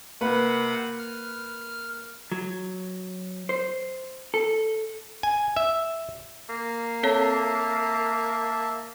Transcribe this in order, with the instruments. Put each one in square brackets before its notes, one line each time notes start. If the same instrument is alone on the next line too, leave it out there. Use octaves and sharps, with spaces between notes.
[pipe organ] C3 F#5 B5 [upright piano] A#3 B4
[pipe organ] F6
[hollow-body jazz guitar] F#3
C5
A4
[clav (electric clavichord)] G#5
E5
[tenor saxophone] A#3
[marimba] C4 A4 C#5 [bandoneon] E5 A5